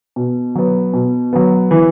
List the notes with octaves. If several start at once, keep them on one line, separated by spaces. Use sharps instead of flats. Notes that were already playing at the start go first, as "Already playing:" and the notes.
B2
F#3 B3
B2
F#3 B3
E3